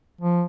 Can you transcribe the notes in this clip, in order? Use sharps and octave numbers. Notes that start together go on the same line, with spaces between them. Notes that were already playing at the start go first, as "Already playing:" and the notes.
F3